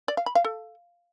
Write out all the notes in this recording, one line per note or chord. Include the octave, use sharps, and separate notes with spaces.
D5
F5
B5
F5
A4